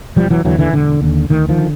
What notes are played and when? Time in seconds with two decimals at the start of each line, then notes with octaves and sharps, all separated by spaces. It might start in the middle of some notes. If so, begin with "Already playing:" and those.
0.16 E1 F3 G3
0.30 E3 F#3
0.44 D#2 D3 E3 F#3
0.59 D3 E3
0.73 E1 D3
1.02 D#2 D3
1.30 D2 D#3
1.49 D#3 F3
1.58 D3